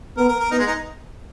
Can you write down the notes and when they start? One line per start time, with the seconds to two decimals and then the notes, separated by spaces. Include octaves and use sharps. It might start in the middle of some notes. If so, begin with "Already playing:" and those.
0.17 B3 A#4
0.29 A#4
0.40 A#4
0.51 B3 D#4
0.59 G#3
0.67 D#4